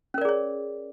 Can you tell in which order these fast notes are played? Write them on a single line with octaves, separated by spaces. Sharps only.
C#4 A#4 D5 G#4 C#5